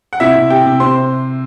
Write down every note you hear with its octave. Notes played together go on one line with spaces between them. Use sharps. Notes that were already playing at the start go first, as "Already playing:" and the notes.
F#5
C3 E4 E5
C3
C3 G4 G5
C3
C3 C5 C6